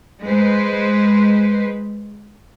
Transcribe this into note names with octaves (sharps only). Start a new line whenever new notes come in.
G#3 B4 C5